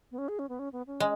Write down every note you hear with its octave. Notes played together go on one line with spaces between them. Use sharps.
B3
C#4
G#4
C#4
B3
C#4
B3
C#4
G#3